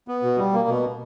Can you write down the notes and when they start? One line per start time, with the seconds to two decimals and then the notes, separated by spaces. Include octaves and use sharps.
0.08 B3
0.23 B2
0.38 G3
0.53 A#3
0.68 B2